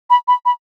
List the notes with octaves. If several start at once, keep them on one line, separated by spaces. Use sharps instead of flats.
B5
B5
B5